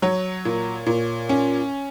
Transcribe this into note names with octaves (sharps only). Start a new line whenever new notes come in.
F#3 C#5
A#2
A#2
C#4